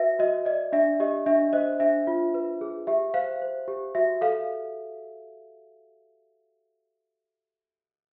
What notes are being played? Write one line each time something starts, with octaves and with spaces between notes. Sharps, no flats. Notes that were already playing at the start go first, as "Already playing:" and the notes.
Already playing: F#4 B4 E5
F#4 D#5
D5 D#5
D4 E5
G4 D#5
D4 E5
C5 D#5
D4 E5
F4
B4
G#4
G4 E5
C5 F5
C5
G4
F#4 E5
A4 F5